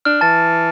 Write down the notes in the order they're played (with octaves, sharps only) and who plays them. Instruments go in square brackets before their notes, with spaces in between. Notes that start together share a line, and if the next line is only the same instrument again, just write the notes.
[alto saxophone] D4 [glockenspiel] F6
[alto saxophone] E3 [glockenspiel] A5 A6